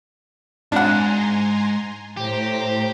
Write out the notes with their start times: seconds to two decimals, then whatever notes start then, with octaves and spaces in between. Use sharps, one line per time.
0.72 G#2 D4 F#5 G#5 A#5 C6
2.17 A2 G4 C5 A#5